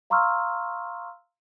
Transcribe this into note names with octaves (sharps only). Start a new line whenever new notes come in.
F5 A#5 C6 C#6 E6 F6